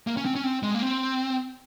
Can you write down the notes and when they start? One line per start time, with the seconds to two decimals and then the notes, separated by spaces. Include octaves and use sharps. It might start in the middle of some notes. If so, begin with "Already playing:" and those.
0.07 A#3
0.17 C#4
0.25 C4
0.35 C#4
0.44 C4
0.63 G#3
0.75 A#3
0.82 C4